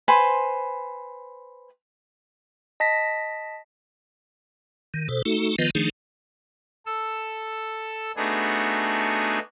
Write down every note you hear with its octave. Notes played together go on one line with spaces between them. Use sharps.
B4 C5 G#5 C6
D#5 A5 A#6 B6
D#3
B2 A4 C5
A3 D#4 F#4 A4
D#3 F3 B3 F4 B4 D#5
D#3 F3 A3 D4 D#4 G#4
A4 E6
A3 B3 D4 D#4 F#4 G#4